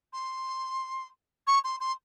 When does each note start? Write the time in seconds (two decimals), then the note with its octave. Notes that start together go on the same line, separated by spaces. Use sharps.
0.13 C6
1.47 C#6
1.64 C6
1.80 C6